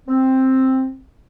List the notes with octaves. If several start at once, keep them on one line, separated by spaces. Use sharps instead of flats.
C4